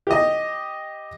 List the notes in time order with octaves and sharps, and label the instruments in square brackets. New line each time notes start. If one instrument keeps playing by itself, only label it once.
[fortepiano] G4 D#5